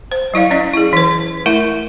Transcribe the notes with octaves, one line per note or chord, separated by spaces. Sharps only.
C5
F#3 E4 D5 F5
C#4 D5 D#5
E4 G#4
E3 B4
A3 E4 A#4 E5